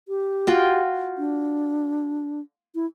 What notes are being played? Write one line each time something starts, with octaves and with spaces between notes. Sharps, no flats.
G4
F4 F#4 G5
D4
E4